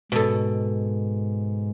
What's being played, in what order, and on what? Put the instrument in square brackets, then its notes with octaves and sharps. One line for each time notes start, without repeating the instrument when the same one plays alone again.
[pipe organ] G#2 [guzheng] B2 A4